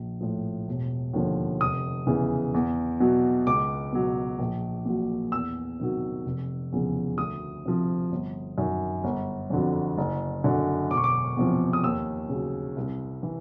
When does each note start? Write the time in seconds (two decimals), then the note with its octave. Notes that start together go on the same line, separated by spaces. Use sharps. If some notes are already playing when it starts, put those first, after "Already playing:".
Already playing: A#1
0.21 A2 F3
0.68 E1
1.13 D#2 D3 F3
1.61 F1 D#6
2.06 E2 C#3 E3
2.54 E2
3.00 B2 F#3
3.47 C#2 D6
3.92 B2 F#3
4.39 A#1
4.85 A#2 F#3
5.32 E2 E6
5.80 C3 D#3 F#3
6.26 F1
6.72 E2 C#3 F3
7.18 D2 D#6
7.65 C3 F3
8.12 G1
8.58 F#2 D#3
9.04 G1
9.50 F2 D3 F#3
9.98 F#1
10.44 F#2 D3 F#3
10.90 E1 D6
10.97 C#6
11.04 D6
11.36 E2 C3 F3
11.73 D#6
11.83 D#2 E6
12.29 C#3 F#3
12.77 C2
13.23 E3